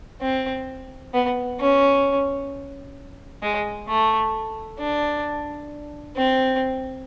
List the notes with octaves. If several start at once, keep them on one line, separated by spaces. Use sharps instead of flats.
C4
B3
C#4
G#3
A3
D4
C4